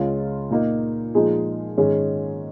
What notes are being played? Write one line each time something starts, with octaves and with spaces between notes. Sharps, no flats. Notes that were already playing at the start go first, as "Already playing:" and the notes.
Already playing: C#2 C#3 G#3 C#4 F4
A#2 A#3 D#4
A#2 F3 G#3 D#4 G#4
G#2 D#3 G#3 C#4 G#4